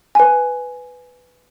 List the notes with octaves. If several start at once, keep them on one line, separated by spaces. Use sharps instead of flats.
B4 G#5